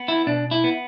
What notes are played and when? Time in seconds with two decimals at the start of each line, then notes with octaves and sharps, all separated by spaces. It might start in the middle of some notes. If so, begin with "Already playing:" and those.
Already playing: B3
0.08 E4
0.27 B2 D4
0.51 E4
0.64 B3